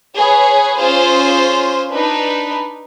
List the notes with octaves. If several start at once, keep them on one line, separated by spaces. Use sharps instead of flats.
G#4 B4 C#5
C#4 F4 G#4 C5
D4 D#4 B4